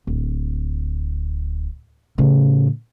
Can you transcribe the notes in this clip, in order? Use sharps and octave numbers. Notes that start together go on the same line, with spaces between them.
D1
A2 C#3